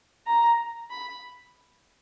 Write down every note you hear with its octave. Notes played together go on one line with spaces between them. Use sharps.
A#5
B5